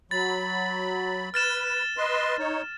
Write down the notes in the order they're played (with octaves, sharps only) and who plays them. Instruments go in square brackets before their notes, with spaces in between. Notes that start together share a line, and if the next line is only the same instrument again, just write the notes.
[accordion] F#3 B5 [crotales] A6
[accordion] B4 [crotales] F6 A6 E7
[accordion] B4 D#5 C6
D#4 C#5